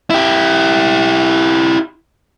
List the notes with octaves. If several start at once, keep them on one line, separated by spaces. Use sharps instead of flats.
E4 G4